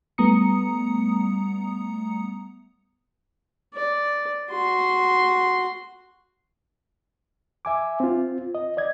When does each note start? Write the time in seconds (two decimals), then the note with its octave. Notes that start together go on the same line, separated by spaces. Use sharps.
0.18 G3 A3 B3 A#5 D#6 C#7
3.74 D5
4.51 F#4 C6
7.65 E5 G#5 D6
8.00 C4 F4
8.55 D#5
8.77 D5 D#5 G#6